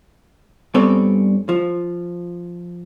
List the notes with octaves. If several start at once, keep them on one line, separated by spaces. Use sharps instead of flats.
G2 B3 C4 A4 C#5 D5
F3